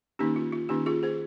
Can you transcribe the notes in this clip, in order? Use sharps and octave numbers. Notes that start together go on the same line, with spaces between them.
D#3 A#3 C#4 D#4 G4
F4
F4
D#3 A#3 C#4 D#4 G4
F4 G#4
G#4 C5